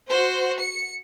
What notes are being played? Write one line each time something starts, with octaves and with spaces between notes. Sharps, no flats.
F#4 C5
C#7